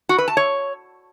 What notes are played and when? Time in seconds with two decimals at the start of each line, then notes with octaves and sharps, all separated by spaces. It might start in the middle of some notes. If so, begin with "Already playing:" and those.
0.09 F#4
0.18 B4
0.28 A5
0.37 C#5